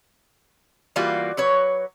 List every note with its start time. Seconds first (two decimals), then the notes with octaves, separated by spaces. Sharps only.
0.96 E3 G3 A#3 F4 F#4
1.37 F#3 B4 C#5